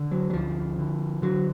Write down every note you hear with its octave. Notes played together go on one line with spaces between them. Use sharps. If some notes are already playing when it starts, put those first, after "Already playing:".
Already playing: D3
F#3
F#3
D2 F3
D3
D3 F#3